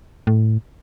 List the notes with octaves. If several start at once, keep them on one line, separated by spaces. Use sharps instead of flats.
A2